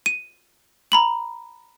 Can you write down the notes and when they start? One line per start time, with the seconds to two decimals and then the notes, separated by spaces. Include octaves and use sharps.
0.06 D#7
0.92 A#5 B5 F#7